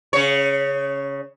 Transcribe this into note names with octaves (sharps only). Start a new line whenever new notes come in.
C#3 C#5